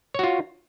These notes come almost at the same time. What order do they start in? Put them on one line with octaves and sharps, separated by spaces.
C#5 F#4 F4